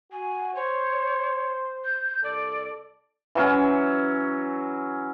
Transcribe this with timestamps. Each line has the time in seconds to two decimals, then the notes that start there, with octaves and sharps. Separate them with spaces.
0.12 F#4 G#5
0.55 C5 C#5
1.85 G6
2.24 C2 A4 D5
3.35 E3 F#3 C#4